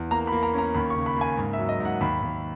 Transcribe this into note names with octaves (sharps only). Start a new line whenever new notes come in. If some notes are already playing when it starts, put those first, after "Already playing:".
Already playing: E2
A#3 A#5
B5
A#3
A#5
C#4 A#5
D#2 B5
C#6
C#3
B5
A#3 G#5
G#2
E5
F#3
D#5
G#2
F#5
D#2 B5
D#2